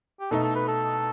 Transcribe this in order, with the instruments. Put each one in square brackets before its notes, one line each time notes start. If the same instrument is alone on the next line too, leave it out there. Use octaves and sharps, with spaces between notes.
[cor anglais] G4
[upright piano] B2 A3 D#4 [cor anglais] A4
[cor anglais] A4
B4
A4